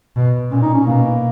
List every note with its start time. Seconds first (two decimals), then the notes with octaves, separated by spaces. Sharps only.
0.16 B2
0.51 A#2 C#4
0.62 D#4
0.74 C#4
0.87 B2 A#3